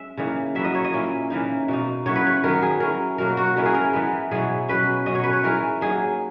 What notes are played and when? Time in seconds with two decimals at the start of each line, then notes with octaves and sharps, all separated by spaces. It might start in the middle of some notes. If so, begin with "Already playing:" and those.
Already playing: G#3 C#4 E5
0.17 C#3 E3 A#3 D#4
0.55 F#3 A#3 E4 E5
0.64 D#5
0.75 C#5
0.84 D#5
0.93 A#2 A#3 C#4 E4
1.30 C#3 E3 A#3 D#4
1.68 B2 A#3 D#4
2.06 C#3 F#3 B3 E4 C#5
2.16 B4
2.27 C#5
2.44 D#3 F#3 B3 A#4
2.62 G#4
2.80 F#3 C#4 E4 A#4
3.18 B2 F#3 A#3 A#4
3.37 F#4
3.56 C#3 G#3 B3 E4 A#4
3.65 G#4
3.74 A#4
3.93 E3 G#3 B3
4.31 B2 F#3 B3 E4 G#4
4.68 B2 F#3 C#4 E4 B4
5.06 B2 F#3 C#4 D#5
5.15 C#5
5.24 B4
5.33 C#5
5.43 E3 G#3 D#4 A#4
5.81 F#3 A#3 D#4 G#4